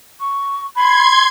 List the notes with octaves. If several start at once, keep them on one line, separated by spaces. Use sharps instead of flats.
C#6
B5 C6 G#6